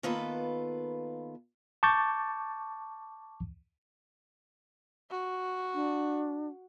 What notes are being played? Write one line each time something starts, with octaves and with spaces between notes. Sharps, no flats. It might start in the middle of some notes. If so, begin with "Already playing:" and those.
D#3 A#3 B3 F4 A4 B4
A5 C#6 D6 G6 A6
F#4
D4